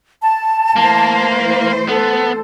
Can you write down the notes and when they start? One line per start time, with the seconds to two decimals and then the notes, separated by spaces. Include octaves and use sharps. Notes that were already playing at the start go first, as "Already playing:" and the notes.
0.21 A5
0.76 E3 A3 A#3 C5
1.89 B3 A4